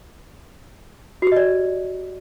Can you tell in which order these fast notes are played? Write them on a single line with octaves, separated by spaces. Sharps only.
F#4 G4 D#5 D5